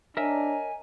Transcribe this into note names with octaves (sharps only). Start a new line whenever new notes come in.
D4 A#4 C#5 D#5 E5 G#5 A#5